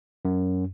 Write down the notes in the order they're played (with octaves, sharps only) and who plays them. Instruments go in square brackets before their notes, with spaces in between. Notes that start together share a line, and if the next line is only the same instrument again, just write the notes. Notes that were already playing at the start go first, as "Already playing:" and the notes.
[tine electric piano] F#2